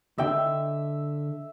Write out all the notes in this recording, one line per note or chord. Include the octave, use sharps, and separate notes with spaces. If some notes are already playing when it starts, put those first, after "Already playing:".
D3 E5 G5